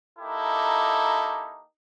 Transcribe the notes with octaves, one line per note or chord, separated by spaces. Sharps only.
A#3 D#4 E4 G4 A4